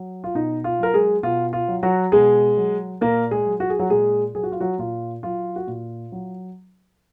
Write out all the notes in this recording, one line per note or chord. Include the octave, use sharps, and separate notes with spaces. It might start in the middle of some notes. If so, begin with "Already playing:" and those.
Already playing: F#3
F4
B2 D#4
F4
F#3 A#4
G#3 G#4
B2 F4
F4
F#3
F#3 F#4
B2 G#3 G#4
F#3
A#2 A#3 A#4
G#3 G#4
F#3
F#4
G#4
F#3 F#4
A#2 G#3 G#4
F#3 G#4
F#4
F4
F#3 F#4
A#2 F4
F#3 F4
F#4
A#2 F4
F#3